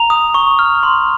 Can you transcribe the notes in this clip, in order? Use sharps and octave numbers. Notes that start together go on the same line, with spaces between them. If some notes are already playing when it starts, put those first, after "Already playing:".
Already playing: A#5 F7
D#6
C#6
F6
C6